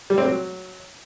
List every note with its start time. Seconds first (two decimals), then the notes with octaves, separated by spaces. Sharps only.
0.10 G3
0.18 C4
0.25 F#3